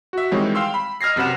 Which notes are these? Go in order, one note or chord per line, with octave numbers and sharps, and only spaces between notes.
F#4 E5
D#3 E3 G3 G#3 C4 C#5
F5 G5 C6 E6
B5
D#5 F6 G#6 A#6 C7
F#2 C3 B4 F#5 E7